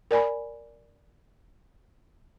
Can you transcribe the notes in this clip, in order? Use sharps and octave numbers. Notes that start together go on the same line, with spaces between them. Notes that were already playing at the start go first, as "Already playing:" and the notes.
A#4 D5 G#5 B5